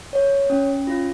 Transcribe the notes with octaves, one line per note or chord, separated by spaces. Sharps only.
C#5
C#4
F4